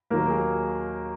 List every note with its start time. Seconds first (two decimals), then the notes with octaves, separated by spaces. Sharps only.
0.10 D#2 D#3 F#3 A#3 A#4
0.30 G#4